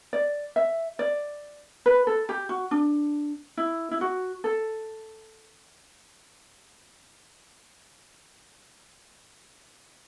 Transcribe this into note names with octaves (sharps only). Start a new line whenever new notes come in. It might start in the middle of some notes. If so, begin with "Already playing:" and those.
D5
E5
D5
B4
A4
G4
F#4
D4
E4
E4
F#4
A4